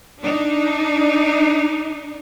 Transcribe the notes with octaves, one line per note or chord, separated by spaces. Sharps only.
D4 D#4